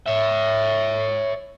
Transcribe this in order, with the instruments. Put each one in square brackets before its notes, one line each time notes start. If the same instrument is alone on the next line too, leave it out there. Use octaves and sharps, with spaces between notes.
[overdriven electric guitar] C#5 E5